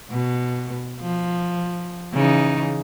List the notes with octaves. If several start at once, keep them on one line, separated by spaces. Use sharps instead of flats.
B2
F3
C#3 E3 D#4